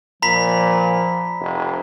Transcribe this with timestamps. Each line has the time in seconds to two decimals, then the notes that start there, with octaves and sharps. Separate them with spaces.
0.22 A#2 F3 A#5 B5 B6
1.40 F1